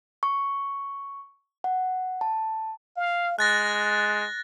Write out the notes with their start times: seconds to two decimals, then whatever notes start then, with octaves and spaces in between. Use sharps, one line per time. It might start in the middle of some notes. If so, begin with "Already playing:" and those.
0.23 C#6
1.64 F#5
2.21 A5
2.97 F5
3.39 G#3 F#6 A6 A#6